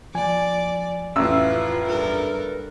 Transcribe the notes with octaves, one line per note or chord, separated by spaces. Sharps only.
F3 D5 G#5
A1 F2 E4 F4 B4 E6
G2 A4 A#4